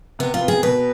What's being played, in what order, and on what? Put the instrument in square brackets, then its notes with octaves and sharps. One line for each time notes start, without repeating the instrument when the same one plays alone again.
[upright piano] C3 [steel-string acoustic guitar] B3
[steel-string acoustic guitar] F4
[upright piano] B3
[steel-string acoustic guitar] G#4
[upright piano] B2 [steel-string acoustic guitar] B4